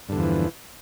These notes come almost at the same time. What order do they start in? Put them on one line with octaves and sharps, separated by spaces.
G2 D3 E2 F3 E3